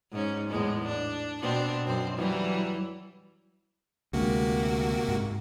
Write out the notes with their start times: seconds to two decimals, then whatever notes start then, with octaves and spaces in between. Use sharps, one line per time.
0.11 G#2 C#4
0.49 E2 A2 G#3
0.87 D4
1.41 B2 C4 D4
1.87 F#2 B2 C4
2.16 E3 F#3 G3
4.13 D2 C3 G#3 A#3 F#4
5.09 G#2